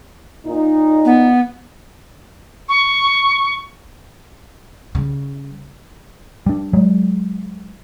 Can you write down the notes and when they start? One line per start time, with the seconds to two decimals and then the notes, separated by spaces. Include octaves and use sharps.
0.46 A#2 D#4
1.05 B3
2.69 C#6
4.95 C#3 G3
6.46 G3 D4
6.73 F#3 G#3